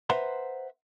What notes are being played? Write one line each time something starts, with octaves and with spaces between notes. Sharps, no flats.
B4 C5 E5 F#5 A#5 C6